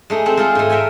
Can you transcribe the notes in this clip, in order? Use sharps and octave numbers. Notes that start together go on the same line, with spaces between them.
G#3 A3 D#4
A3 C4
G#3 F4 A4
G#2 A3
A#4 C#5 E5 G5 G#5